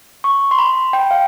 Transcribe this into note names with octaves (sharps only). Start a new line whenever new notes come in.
C#6
C6
B5
G5
F5